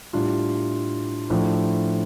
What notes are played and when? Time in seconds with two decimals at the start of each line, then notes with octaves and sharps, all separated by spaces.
0.13 A2 G3 D4 F4
1.30 A2 F3 A3 D4 F4